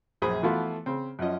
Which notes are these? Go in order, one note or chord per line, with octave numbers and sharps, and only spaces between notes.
A#1 F#2 G#4 C5 B5
E3 F3 A3 B3 F4 F#4
C#3 C4
F#2 F3 C#4 D#5